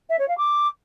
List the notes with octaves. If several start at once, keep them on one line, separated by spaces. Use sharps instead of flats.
E5
C#5
F5
D6